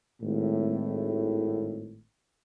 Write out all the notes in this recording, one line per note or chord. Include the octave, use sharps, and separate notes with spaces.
G#1 A2